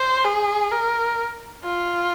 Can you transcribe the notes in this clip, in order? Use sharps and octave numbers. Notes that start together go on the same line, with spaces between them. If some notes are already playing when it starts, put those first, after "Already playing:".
Already playing: C5
G#4
A#4
F4